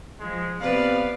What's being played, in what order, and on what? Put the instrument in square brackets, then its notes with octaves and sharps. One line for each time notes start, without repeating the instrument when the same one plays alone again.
[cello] F3 [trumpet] G#3
[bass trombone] C3 [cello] B3 [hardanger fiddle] B4 D5 [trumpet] F5